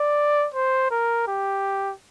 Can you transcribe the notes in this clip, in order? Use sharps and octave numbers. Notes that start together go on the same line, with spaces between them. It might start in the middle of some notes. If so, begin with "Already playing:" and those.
Already playing: D5
C5
A#4
G4